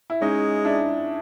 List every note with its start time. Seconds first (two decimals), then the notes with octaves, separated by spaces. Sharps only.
0.10 E4
0.21 G#3 C#4 D#4
0.65 D4 E4